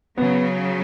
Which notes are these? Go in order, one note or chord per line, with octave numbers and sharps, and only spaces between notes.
C#3 F#3 B3